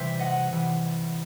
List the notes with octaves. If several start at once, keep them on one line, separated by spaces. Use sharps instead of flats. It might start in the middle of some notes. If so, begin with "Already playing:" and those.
Already playing: C3 E3 G3 C5 E5
D#5 F#5
C3 E3 G3